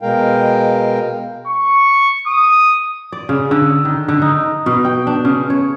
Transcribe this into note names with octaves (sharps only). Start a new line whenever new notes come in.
B2 G#3 A#4 F5 G5
C#6
D#6
D5
C#3
D3
D#3
D3
D#4
B2
G5
D4
C#3
C#5